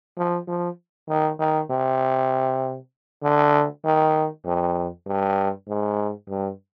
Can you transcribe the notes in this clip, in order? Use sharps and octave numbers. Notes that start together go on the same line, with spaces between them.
F3
F3
D#3
D#3
C3
D3
D#3
F2
G2
G#2
G2